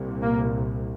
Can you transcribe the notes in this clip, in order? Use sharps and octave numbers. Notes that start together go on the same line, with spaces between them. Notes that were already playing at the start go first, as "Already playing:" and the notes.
Already playing: C2 A#2
A#3